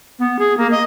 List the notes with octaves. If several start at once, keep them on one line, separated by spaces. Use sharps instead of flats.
B3
G#4
A#3
D#5